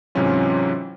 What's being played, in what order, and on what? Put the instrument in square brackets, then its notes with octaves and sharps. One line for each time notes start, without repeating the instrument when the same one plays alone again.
[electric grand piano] G#2 C3 E3 F#3 C#4 F4